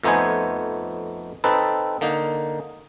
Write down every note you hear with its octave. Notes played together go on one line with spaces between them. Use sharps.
F2 A3 B3 D#4 C5 G#5
C4 D#4 A4 B4
D3 A#3 D#4